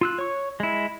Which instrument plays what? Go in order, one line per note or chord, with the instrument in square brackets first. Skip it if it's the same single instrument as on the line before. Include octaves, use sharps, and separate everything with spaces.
[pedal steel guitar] F4 E6 F#6
C#5 C#6
G#3 E4